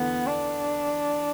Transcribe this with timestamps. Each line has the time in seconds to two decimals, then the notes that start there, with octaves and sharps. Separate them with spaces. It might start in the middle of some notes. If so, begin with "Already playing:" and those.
Already playing: E2 D3 A3 B3
0.27 D4